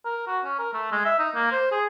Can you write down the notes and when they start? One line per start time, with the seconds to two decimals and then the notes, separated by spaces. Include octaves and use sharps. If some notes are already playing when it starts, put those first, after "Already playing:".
0.05 A#4
0.27 F#4
0.44 C#4
0.59 A#4
0.73 A3
0.92 G#3
1.05 E5
1.19 D#4
1.35 A#3
1.52 C5
1.71 G#4